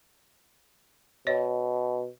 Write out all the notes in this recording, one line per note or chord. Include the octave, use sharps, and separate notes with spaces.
B2 C#5 D#5